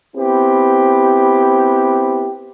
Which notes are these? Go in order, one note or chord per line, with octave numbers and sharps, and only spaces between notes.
B3 C4 E4 G4